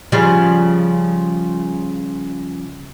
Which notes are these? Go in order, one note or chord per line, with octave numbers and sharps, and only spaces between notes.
C#3 F3 G3